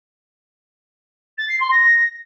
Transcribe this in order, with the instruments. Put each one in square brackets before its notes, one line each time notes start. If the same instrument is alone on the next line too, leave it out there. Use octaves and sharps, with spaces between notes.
[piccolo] A6
C7
C6
A#6